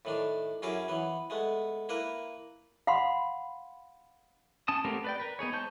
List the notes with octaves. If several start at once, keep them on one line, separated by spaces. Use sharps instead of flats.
A2 D#3 D4
F#2 C#4 E4 G#4 A#4 D6
E3 B3
G#3 A3 B3
A#3 E4 A#4 B4
F5 F#5 B5 C6
C#4 A5 D#6
A3 B3 C4 G4 A#4
B4 D5 G5
A#4 B4
B3 D#4 G#4 C#5
G#3 C5 A5 C#6 G6